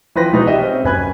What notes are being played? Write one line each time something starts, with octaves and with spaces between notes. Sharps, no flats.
E3 F3 B4 G5 C6 A#6
B2 E3 G#3 B3 D#4 B4
G4 D#5 E5
C4 C#4
F#1 B4 G#5 B5 F#6 G#6